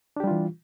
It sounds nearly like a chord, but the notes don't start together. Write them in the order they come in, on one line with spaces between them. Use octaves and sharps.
D4 G4 G3 F4 E3